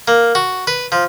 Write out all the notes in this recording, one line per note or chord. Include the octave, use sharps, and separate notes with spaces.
A#3
F#4
B4
F3